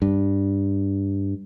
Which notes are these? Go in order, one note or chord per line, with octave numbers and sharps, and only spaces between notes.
G2